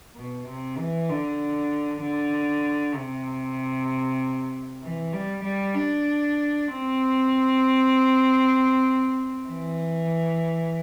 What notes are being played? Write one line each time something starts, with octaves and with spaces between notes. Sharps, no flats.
B2
C3
E3
D3
D3
C3
E3
G3
G3
D4
C4
E3